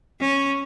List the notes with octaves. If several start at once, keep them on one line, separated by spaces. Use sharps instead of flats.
C#4